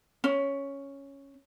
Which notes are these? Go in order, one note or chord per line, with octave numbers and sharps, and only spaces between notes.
C#4